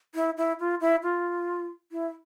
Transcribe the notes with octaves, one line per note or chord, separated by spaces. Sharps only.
E4
E4
F4
E4
F4
E4